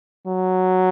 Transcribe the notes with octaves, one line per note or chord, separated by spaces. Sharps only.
F#3